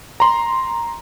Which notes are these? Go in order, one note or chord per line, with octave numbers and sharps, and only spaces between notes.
A#5 C6